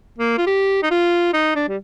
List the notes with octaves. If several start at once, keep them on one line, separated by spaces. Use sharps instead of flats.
A#3
F4
G4
D#4
F4
D#4
D4
G3